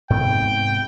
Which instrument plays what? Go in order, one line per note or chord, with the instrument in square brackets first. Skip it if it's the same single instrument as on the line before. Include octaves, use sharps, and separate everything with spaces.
[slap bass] G#2 C3 B3 [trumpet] G5